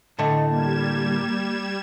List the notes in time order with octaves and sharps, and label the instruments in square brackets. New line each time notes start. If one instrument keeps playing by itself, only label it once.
[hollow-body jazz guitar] A2 D3 A3 [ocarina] D#5
[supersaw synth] G3 G#6 E7 [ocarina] A#3